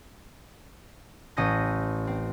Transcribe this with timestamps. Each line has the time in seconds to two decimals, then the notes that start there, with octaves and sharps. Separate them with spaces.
1.37 A1 C#4 D#6 G6 A#6
2.07 C4